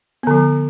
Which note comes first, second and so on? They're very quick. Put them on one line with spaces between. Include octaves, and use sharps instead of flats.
B3 D3 F3